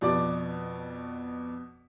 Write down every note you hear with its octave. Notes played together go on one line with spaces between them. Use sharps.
F2 B2 D5 A5 D6